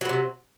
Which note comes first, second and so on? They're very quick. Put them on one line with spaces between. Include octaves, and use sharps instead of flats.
F#3 A2 C3